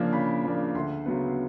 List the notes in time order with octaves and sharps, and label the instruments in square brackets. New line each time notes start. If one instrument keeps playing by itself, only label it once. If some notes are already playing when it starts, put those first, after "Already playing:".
Already playing: [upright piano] C#3 F3 A#3 D4
C#3 B5
F3 A#3 D4
D2 C6
C#3 F#3 B3